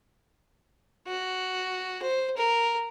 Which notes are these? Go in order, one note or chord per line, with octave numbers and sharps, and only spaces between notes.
F#4
C5
A#4